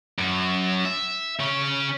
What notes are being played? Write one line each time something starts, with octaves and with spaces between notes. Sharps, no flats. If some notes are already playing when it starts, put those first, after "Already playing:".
F#2
E5
C#3 C#4